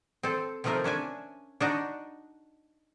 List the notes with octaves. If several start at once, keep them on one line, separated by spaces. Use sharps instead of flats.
C4 A4
C3 D#3 F3 A3 C4 A#4
C#4 D4 E5 G#5
D4 D#4 F#4